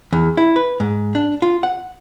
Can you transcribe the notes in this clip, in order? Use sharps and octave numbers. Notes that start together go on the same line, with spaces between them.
E2
E4
B4
G#2
D4
F4
F#5